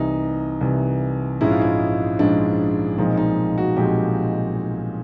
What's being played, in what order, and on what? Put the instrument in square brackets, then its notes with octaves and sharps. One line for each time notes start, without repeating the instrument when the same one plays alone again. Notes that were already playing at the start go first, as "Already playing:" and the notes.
Already playing: [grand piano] C2 C3 E3 D#4
C2 C3 E3
A#1 G#2 F3 G#3 C#4 E4
F4
E4
A#1 G#2 F3 G#3 C#4 D4
B1 A#2 F3 G#3 C4 D#4
D#4
F#4
B1 A#2 F3 G#3 C4 G4